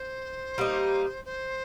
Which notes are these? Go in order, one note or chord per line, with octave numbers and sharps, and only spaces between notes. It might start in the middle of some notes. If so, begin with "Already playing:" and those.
Already playing: C5
G3 A#3 D#4
C5